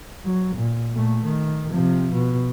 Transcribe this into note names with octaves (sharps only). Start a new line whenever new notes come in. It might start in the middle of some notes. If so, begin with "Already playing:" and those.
F#3
A#2
A#2 A3
D#3
C3 F3
B2